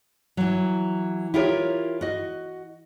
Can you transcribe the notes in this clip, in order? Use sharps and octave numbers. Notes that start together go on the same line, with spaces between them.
E3 F#3
E4 F4 G4 A#4 C#5
F#4 D#5